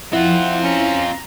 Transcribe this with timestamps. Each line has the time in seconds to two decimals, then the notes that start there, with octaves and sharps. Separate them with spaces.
0.13 F3 C4 E4 F4 F#5
0.63 C#4 A#5